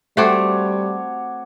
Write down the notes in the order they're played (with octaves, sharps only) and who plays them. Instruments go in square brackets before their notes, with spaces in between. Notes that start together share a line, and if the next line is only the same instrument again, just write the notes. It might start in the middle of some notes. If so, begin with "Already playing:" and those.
[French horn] G3 [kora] A3 C4 [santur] F#4 C#5 D6 [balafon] A4 E5